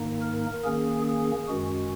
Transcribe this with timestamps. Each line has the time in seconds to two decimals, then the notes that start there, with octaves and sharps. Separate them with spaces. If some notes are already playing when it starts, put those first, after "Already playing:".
Already playing: G#2 D#3 A#3 D#4
0.22 A#4
0.64 D#3 A#3 C#4 G#4
1.06 G#4
1.47 F#2 D#3 G#3 C#4 F#4